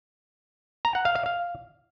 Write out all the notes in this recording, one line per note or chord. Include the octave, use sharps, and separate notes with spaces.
A#5
F#5
F5
F5
F5